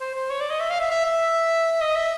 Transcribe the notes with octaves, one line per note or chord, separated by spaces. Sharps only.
C5
C5
C#5
D5
D#5
E5
F5
E5
E5
E5
D#5
E5